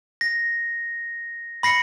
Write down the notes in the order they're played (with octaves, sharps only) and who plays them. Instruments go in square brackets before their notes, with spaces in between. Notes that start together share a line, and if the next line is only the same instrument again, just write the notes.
[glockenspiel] A#6
B5 A#6 C7 C#7